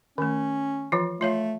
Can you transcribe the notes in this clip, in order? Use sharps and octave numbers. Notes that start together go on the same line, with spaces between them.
D#3 A3 C#4
E3 F3 F4
A3 F4 C#5 F5